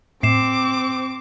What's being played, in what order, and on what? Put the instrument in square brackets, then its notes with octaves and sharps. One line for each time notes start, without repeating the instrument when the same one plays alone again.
[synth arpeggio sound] A2 [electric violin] C4 [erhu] D6 [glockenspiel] C7 E7